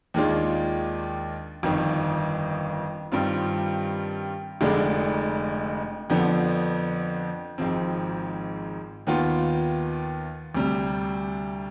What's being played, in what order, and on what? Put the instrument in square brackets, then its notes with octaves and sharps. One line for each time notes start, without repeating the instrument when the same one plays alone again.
[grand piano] D#2 D#3 G#3 D4 F4
G1 F2 D#3
G2 D#3 G3 C4 F4
F1 F2 D3 G#3 D4
F2 D3 F3 B3 D4
G#1 G#2 F3 C4
D#2 D#3 B3 F4
D2 C3 G3